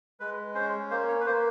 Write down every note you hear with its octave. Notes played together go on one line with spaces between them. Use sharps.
G#3 B4
C#4 C5
A#3 C5
C#5
B4
A#3 C5